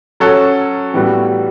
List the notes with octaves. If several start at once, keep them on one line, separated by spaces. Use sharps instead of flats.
F#3 C#4 F#4 A4
A2 E3 G3 B3 F#4